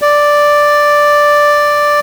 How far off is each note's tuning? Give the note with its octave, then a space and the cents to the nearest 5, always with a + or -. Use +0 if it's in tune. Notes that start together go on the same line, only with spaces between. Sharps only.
D5 +0